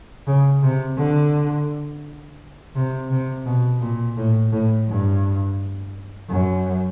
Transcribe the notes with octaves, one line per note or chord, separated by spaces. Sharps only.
C#3
C3
D3
C3
C3
B2
A#2
A2
A2
G2
F#2